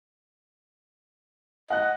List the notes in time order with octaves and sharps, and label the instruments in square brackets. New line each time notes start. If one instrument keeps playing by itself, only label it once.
[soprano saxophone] D#5 [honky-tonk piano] F#5 F#6